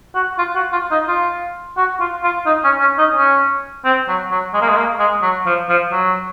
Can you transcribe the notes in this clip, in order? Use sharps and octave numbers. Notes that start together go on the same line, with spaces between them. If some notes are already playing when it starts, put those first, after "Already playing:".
F#4
F4
F#4
F4
D#4
F4
F#4
F4
F4
D#4
C#4
C#4
D#4
C#4
C4
F#3
F#3
G#3
A#3
G#3
A#3
G#3
F#3
F3
F3
F#3